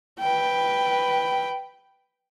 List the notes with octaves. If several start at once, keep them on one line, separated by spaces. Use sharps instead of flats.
B4 G5